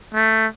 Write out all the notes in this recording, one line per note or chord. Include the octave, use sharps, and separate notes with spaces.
A3